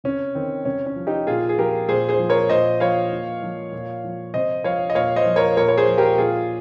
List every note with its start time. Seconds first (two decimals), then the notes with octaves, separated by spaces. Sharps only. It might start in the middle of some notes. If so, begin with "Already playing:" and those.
0.04 C3 C#4
0.35 D#3 C4
0.65 C3 C#4
0.86 C#4
0.96 F3
1.07 D#4 G4
1.27 A#2 F4 G#4
1.49 G#4
1.57 F3 G4 A#4
1.88 A#2 G#4 C5
2.08 G#4 C5
2.19 F3
2.29 A#4 C#5
2.49 A#2 C5 D#5
2.80 F3 C#5 F5
3.12 A#2
3.43 F3
3.72 A#2
4.04 F3
4.34 C3 C5 D#5
4.64 F3 C#5 F5
4.90 D#5
4.95 A#2 C#5 F5
5.16 C5 D#5
5.26 F3
5.36 A#4 C#5
5.57 A#2 A#4 C#5
5.68 C#5
5.77 G#4 C5
5.88 F3
5.98 G4 A#4
6.18 A#2 F4 G#4